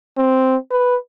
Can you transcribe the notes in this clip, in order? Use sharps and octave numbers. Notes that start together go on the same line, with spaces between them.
C4
B4